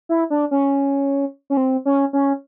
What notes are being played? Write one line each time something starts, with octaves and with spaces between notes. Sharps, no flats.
E4
D4
C#4
C#4
C4
C#4
C#4